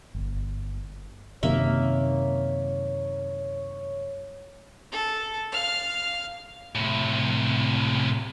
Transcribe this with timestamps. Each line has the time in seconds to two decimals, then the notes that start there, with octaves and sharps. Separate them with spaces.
0.15 G1
1.43 F#2 C3 D#3 A#3 C#5 E5
4.92 A4
5.52 F5 F6
6.75 A2 C3